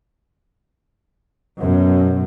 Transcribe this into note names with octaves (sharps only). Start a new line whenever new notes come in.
F#2 B2